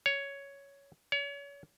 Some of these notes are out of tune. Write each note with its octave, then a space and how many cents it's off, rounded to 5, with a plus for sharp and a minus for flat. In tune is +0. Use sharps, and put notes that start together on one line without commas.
C#5 +10
C#5 +35